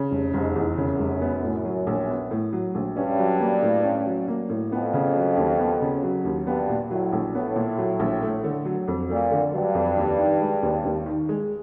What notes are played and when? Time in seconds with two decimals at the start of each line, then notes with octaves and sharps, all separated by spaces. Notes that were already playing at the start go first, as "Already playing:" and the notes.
Already playing: C#3
0.11 F1
0.34 F1 G#2
0.56 E2
0.77 F#2 C#3
0.99 F1
1.21 B3
1.43 A2
1.65 F#3
1.87 A#1
2.09 B3
2.31 A2
2.53 F#3
2.75 A#1
2.96 G2 C#4
3.19 F#3
3.40 A#3
3.62 A2
3.84 C#4
4.06 F#3
4.28 A#3
4.49 A2
4.72 F2 B3
4.93 C#3
5.15 F#3
5.37 D#2
5.59 B3
5.81 C#3
6.03 F#3
6.25 D#2
6.47 G2 B3
6.69 A#2
6.91 A2 F#3
7.13 A#1
7.34 A2 B3
7.56 A#2
7.78 F#3
8.00 A#1
8.22 A3
8.44 D3
8.65 F#3
8.88 F2
9.10 A#2 A3
9.31 D3
9.53 G2 F#3
9.75 F2
9.97 D#2
10.19 D#3
10.41 G#3
10.63 D#2
10.85 D#2
11.06 D#3
11.29 G#3